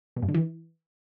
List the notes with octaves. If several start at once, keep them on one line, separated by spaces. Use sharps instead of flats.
B2
G2
D3
E3